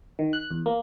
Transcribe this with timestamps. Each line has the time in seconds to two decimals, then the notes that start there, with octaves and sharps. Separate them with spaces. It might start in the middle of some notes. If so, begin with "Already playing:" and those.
0.19 D#3
0.33 F#6
0.50 E2
0.66 A#3